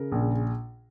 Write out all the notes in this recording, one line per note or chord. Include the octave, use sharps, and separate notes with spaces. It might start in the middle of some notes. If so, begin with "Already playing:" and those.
Already playing: C#3 A#4
A#1